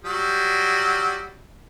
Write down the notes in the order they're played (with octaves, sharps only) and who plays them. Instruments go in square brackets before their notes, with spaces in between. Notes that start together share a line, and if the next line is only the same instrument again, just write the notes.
[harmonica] F#3 G3